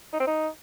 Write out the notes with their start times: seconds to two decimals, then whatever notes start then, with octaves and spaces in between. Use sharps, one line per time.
0.13 D#4
0.20 C4
0.27 D#4